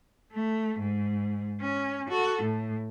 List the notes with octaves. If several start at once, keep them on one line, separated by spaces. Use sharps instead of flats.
A3
G#2
C#4
F#4 A4
A2